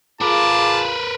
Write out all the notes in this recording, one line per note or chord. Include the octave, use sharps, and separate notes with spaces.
F4 G#4 A#4 B4 A5 D6